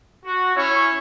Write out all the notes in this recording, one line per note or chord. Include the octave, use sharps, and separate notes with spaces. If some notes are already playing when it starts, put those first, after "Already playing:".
F#4
C#4 E4 C#5